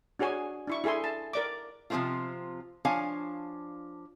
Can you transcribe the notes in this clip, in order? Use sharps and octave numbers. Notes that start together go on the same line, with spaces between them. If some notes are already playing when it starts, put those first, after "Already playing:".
D4 F#4 G#4 C#5 G#5
D4 E4 C#6
E4 G#4 A4 G#5 C6
A5
A#4 D5 D6
C3 F3 G3 A3 C4 F4
F3 D4 C#5 F5 G#5